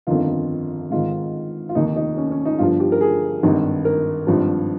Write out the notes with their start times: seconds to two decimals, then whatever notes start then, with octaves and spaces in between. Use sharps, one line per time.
0.07 G1 F2 D#3 F4
0.91 G#1 G#2 D#3 F4
1.69 F4
1.75 F1 D#2 D#3 D#4
1.96 D#4
2.17 C#4
2.31 C#4
2.45 D#4
2.59 G1 G2 F3 F4
2.80 G4
2.92 A#4
3.01 G#4
3.43 G#1 G2 D#3
3.85 A#4
4.27 G#1 G2 F3